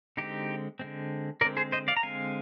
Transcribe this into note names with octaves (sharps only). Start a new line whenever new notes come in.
D3 G#3 C4 D#4 G4
D3 G#3 C4
D3 G#3 C4 A#4 D5
G#4 C5
C5 D#5
D5 F5
A#5
D3 G#3 C4 F5 G#5